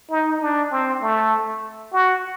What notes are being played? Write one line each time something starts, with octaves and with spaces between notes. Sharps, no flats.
D#4
D4
C4
A3
F#4